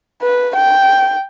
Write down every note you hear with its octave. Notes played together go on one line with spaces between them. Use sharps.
B4
G5